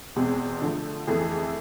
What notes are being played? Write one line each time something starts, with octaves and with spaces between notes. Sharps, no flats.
E2 B2 G#3 C4 G#4
D3 F3 A3
F2 E3 A3 E4 G#4